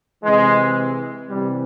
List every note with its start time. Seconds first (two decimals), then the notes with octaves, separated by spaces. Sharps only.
0.23 C3 E3 G#3
1.29 C3 E3 G3